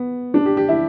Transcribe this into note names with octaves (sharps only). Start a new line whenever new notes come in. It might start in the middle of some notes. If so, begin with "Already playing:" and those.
Already playing: B3
D4
G4
G4
E4